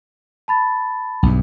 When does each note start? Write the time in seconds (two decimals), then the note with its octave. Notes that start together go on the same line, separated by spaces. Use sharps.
0.48 A5 B5 A6
1.23 B1 G2